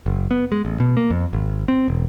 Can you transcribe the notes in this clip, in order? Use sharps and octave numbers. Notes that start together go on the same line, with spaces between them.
F#1
B3
G#3
A1
B2
A#3
F2
G#1
C4
E1